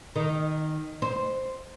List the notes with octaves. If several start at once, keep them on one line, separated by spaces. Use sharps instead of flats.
D#3
C5